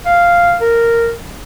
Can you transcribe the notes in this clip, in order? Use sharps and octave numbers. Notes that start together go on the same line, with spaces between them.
F5
A#4